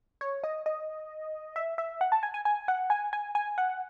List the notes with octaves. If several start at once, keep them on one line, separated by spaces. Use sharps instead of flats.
C#5
D#5
D#5
E5
E5
F#5
A5
G#5
G#5
G#5
F#5
G#5
G#5
G#5
F#5